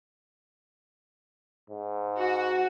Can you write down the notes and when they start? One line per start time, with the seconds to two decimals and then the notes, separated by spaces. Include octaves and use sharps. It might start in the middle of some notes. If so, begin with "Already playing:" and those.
1.70 G#2
2.18 F#4